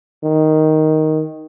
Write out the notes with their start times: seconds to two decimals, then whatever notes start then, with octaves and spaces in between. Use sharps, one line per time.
0.24 D#3